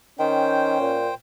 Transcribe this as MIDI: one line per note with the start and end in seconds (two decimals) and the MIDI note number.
0.19 0.76 51
0.19 1.00 61
0.19 1.14 72
0.19 1.14 79
0.80 1.09 46